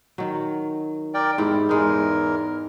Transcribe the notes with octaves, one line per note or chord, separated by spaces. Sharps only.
D#3 F#3
A#4 D5 G5
E2 G#2 E4 G4
E2 G#3 D#4 A#4